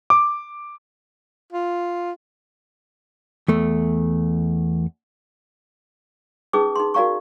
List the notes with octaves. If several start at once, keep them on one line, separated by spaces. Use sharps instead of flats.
D6
F4
E2 A3
C#4 D#4 G#4 B4 D6 D#6
D#4 C6
F#4 A#4 D5 F5 A#5 C#6